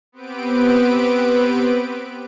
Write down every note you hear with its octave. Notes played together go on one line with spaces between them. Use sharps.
B3 C4 G4 B4 D7